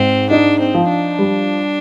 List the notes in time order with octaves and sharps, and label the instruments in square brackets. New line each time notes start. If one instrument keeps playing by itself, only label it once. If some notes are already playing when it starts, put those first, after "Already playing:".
Already playing: [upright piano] G#2 [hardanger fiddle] C4
[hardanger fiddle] D4 [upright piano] D#4
[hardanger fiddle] C4
[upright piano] F3
[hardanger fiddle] D4
[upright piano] G3